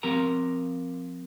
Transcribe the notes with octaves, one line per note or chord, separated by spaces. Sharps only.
F3 C4 G4 A#4 A#5